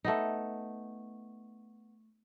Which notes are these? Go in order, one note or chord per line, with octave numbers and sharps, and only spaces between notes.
A3 B3 D#4